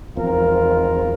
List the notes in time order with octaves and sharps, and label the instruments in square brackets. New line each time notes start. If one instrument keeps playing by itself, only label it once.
[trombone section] G#1 F4 A#4 [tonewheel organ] E2 F3 C4